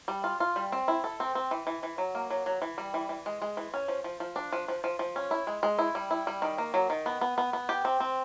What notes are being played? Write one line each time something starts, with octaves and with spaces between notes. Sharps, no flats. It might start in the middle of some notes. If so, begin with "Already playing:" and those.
G3
F4
F4
G3
C4
E4
A4
C4
C4
E3
E3
E3
F#3
A#3
F#3
F#3
E3
G3
E3
E3
G#3
G#3
E3
C#4
F3
F3
F3
D4
F3
F3
F3
F3
C#4
E4
G#3
G#3
E4
G3
E4
G3
D#3
A#3
F#3
D#3
B3
B3
B3
B3
G4
C4
C4